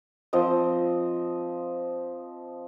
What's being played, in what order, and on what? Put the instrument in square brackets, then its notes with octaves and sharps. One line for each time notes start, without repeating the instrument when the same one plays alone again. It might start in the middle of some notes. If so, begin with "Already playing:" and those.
[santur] F3 C4 D#5